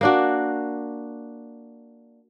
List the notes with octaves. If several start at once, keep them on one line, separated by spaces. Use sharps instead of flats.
A#3 D4 F#4